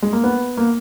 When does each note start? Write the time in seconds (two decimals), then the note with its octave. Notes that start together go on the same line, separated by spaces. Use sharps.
0.02 G#3
0.13 A#3
0.24 B3
0.57 A#3